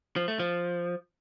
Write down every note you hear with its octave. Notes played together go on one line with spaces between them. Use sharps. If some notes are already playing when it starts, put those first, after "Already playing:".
F3
A3
F3